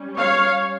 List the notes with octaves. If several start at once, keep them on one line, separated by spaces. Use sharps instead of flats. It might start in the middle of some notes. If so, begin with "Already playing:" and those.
Already playing: G3 C#4
C#5 F5